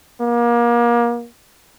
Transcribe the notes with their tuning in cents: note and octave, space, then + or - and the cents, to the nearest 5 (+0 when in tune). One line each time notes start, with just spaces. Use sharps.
A#3 +30